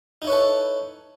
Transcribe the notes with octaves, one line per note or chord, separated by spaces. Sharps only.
D#4 E4 A4 B4 C#5